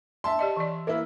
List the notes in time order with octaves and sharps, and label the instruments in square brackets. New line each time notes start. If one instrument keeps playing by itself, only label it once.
[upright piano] E5 A5 C6
[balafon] G4 D5 D#5
E3 D5
[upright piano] A#3 E4 [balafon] B4 E5